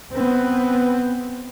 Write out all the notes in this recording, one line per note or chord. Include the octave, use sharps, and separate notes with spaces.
B3 C4